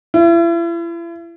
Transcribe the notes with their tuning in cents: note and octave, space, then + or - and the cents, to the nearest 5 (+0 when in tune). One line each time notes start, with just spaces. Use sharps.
E4 +40